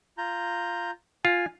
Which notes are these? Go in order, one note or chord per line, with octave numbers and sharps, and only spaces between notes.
F4 A#5 G6
F4 G#5